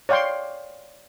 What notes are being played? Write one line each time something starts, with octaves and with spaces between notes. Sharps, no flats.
C#5 D5 F5 G5 C6